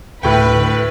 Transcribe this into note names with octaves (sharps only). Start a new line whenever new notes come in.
D2 A2 B4 G5